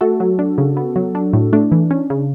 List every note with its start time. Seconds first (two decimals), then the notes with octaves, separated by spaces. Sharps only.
0.01 A3 F#4 A4
0.20 F#3
0.39 D4
0.58 C#3
0.77 B3
0.96 F#3
1.15 D4
1.33 A2
1.53 A3 D4
1.72 E3
1.91 C#4
2.10 C#3